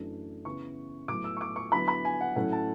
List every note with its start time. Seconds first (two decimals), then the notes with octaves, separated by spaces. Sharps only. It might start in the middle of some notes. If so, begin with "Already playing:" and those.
Already playing: F#2 E3 A3 D4
0.45 C#3 E3 B3 E4 C#6
1.08 A2 F#3 B3 D6
1.24 E6
1.37 C#6
1.41 D6
1.56 C#6
1.72 D3 F#3 B3 E4 B5
1.88 B5
2.05 G#5
2.21 F#5
2.36 A2 F#3 A3 C#4 E4 F#5
2.52 A5